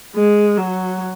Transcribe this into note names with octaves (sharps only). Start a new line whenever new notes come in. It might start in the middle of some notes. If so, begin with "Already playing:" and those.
G#3
F#3